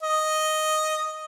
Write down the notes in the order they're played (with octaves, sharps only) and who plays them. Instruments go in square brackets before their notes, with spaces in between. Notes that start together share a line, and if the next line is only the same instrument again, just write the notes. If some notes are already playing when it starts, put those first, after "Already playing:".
[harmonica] D#5